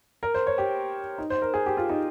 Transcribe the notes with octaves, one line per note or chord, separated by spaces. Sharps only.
A#4
C5
C#5
G4
D#4
C5
A#4
G#4
G4
F4
D#4